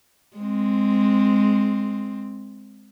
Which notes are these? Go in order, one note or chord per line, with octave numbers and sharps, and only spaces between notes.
G#3 C4